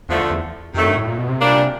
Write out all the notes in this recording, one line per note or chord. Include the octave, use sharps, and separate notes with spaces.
E2 D3 F3 A3
E2
F2 C3 D#3 F#3 A3
G2
A2
A#2
B2
C3
A#2 G3 A#3 D4